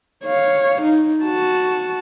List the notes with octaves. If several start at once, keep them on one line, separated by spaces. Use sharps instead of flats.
C#5 F5
D#4
F#4 A5